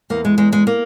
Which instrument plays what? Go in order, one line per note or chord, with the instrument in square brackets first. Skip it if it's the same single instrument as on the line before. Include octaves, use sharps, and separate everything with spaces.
[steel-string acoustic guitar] E2 A#3
G#3
E2 G#3
G#3
A#3